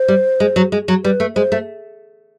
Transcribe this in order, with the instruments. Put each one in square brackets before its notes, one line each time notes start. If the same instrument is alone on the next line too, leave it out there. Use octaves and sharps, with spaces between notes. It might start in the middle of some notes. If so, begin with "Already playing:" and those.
Already playing: [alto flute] C5
[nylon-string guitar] G3
G#3
F#3
G#3
F#3
[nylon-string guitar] G3 [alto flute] B4
[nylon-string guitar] A3
[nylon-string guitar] G#3 [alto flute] C5
[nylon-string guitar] A3